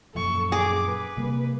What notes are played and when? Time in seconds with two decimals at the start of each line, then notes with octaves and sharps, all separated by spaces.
0.15 F#2 A#2 F3 A4 C#6
0.52 G#4 D6
0.84 B4
1.17 C3 G3 A#3